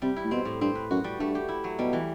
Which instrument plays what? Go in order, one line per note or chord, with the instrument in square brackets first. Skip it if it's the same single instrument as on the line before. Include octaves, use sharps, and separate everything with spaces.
[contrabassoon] C3 [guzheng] G3
[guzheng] E4
[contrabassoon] A2
[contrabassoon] B2 [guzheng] C4
[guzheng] A2
[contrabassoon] G2 [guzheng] C4
[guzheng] B4
[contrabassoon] F#2 [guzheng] F#4
[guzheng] G3
[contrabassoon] G2 [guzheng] A3
[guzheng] G4
E4
F#3
[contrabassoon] B2 [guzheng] G3
[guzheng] E3